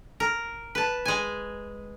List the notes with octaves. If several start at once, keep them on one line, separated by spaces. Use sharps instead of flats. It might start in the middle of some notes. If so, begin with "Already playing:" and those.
A#4
B4 A5
G#3 G#5